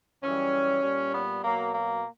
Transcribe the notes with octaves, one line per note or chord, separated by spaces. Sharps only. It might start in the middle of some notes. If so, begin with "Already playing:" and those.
F#2 E3 G3 C#4
A#2 G3
B3
B2 F#3 A#3
A#3